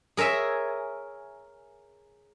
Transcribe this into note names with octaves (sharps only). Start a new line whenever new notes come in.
G#4 A#4 C#5 E5 G#5